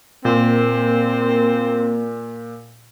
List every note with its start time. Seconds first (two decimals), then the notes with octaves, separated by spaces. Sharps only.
0.25 A#2 A#3 C4